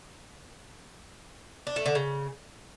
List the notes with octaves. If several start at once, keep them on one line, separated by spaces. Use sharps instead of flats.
D4
A3
D3
C#3